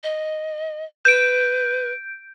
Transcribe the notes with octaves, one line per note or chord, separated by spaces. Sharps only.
D#5
B4 G6 D7